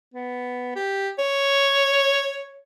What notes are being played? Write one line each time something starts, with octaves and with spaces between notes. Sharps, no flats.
B3
G4
C#5